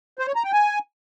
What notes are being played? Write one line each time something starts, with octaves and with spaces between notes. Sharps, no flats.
C5
C#5
A#5
G5
G#5